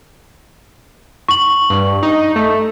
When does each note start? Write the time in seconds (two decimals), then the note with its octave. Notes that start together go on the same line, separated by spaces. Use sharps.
1.29 C#6 F#7
1.70 G2
2.03 D#4
2.36 A3